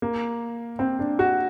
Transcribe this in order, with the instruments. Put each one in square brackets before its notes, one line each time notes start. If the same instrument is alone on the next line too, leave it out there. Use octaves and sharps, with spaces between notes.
[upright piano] A#3
C4
D4
F#4